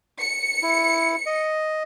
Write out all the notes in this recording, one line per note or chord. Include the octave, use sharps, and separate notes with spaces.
C#7
E4
D#5